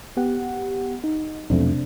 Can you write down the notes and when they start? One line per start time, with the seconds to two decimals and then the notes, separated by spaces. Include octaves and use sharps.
0.17 B3 G4 F#5
1.04 D#4
1.50 B1 F2 C3 A3 C4 D4